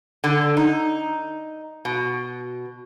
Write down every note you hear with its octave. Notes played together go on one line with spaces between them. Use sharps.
D3
D#4
B2